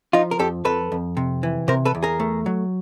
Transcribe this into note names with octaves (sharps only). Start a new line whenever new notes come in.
F3 D#4 F4
A#4
F2 G4 A4
F2 A4 B4
F2
C3
E3
C3 A#4 C5
A4 B4
E2
G#4 A#4
A3
F#3